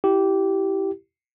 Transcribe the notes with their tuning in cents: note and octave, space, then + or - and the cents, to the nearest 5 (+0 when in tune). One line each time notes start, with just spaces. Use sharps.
E4 +0 G4 -15